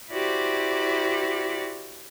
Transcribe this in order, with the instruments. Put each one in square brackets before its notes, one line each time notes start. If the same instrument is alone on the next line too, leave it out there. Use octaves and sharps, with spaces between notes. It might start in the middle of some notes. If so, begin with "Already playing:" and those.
[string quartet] E4 F#4 G4 C5 D5